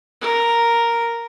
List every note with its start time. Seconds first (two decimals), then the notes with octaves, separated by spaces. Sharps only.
0.21 A#4